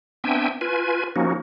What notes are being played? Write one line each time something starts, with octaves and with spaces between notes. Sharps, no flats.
B3 C4 D4 E5 G5 G#5
F4 B4 G#5
F3 A#3 C#4 D#4 F#4